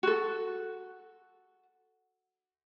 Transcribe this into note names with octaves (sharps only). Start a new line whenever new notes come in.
F#4 A4